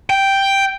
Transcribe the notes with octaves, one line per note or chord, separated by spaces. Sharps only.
G5